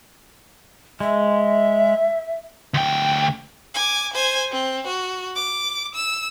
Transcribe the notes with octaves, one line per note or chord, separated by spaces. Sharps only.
G#3 E5
D2 G5
G#5 D6
C5 G#5
C4
F#4
D6
E6